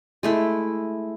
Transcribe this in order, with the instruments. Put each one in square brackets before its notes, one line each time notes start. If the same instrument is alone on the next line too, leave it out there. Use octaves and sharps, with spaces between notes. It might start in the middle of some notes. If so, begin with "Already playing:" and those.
[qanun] G#3 A3 E4